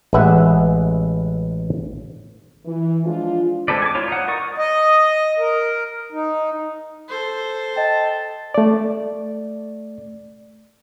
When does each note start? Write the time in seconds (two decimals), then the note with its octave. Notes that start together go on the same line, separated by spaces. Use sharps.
0.13 A1 G#3 B4 E5 F#5
2.66 E3
3.05 F3 G#3 D4 F4
3.68 G#3 C4 A4 B4 D5
3.82 G#5 D6
3.95 E4 F4 C#5
4.08 D#4 F#5
4.28 A#4 D5 C#6 D#6
4.58 D#5
5.39 A#4
6.12 D#4
7.09 A4 C5
7.76 D#5 G5 A5
8.54 A3 D5